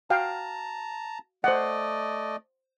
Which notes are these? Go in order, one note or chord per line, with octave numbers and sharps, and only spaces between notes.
F#4 F5 G5 A5 A#5
A3 C5 D5 D#5 F#5